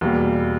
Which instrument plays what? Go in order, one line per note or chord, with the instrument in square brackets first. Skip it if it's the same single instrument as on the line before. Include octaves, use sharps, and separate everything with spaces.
[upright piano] E2 B2 G3 A#3